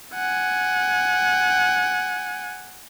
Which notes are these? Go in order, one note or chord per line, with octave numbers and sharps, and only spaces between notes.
F#5 G#5